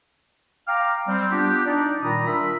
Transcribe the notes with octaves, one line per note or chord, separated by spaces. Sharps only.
F5 G5 A#5 D6 F6
G3 C4
B3 D4 F4 G4
D4 D#4 D5
A#2 D#3 G3 A#5 B5 D#6
D4 F4 A#4 E5 B5